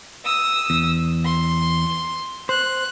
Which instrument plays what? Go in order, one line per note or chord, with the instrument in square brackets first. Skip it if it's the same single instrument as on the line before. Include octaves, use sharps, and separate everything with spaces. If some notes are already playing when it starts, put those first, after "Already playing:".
[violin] D#6 E6
[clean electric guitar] E2
[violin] C6
[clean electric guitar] C5 [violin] F#6